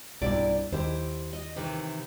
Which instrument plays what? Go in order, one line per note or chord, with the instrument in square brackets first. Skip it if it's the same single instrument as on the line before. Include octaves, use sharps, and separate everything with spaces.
[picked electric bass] B1 G2 [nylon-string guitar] C3 E4 D5
[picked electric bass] D#2 [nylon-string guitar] E4 G4 C5
[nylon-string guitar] D#5
C3 D#3 E3